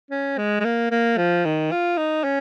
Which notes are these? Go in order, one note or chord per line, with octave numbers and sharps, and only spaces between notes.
C#4
G#3
G#3
A#3
A#3
F3
D#3
F4
D#4
C#4